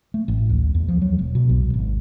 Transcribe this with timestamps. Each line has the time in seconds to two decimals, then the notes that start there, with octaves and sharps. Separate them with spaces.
0.14 A3
0.28 A1
0.50 D2
0.75 E2
0.88 F3
1.02 F#3
1.19 E1
1.35 B2
1.49 B1
1.74 G#1